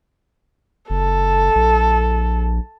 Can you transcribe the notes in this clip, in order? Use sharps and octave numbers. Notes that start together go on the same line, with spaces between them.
F#1 A4
A#1